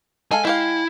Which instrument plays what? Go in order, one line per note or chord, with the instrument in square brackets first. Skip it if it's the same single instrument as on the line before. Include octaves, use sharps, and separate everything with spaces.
[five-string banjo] G#3 A4 F5 [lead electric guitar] G#5
[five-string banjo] G#3 G4 F5 [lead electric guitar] E4